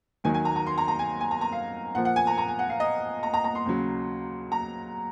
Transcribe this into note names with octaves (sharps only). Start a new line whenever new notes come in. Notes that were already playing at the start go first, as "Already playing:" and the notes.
D#2 D#3 F#3 G#5
G#5
A#5
A#5
C6
A#5
A#5
G#5
G#5
A#5
A#5
F5
A#2 F3 A#3 F#5
F#5
G#5
A#5
A#5
G#5
F#5
F5
D#5
A#5
A#5
A#5
C6
D#2 C#3 F#3
A#5